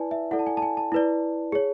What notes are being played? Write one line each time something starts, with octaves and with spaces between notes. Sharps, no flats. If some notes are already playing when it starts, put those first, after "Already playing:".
Already playing: E4 B4 D5 G#5 A5
E5
E4 A4 D5 F#5
A5
G#5
A5
G#5
A5
E4 B4 D5
G#4 C#5